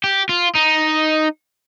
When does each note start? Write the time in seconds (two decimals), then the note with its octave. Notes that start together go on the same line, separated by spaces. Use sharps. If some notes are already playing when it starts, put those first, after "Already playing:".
0.04 G4
0.29 F4
0.55 D#4